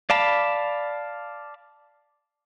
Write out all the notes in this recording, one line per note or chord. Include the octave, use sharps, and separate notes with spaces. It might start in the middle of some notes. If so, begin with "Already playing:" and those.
D5 F5 A5 B5